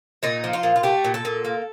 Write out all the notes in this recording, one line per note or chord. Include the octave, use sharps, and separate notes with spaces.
A#2 D#4
F3
F4
A#2
F4
A3 G4
A#2
A4
A#2
A#3